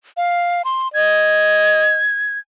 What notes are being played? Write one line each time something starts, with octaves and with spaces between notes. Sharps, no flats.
F5
C6
D#5 G#6